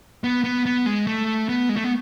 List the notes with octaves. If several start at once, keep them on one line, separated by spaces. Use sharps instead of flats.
B3
B3
B3
G#3
A3
B3
G#3
A3
B3